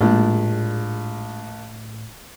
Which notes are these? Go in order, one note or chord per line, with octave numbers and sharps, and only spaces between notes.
A#1 A2 G#3 D4 G4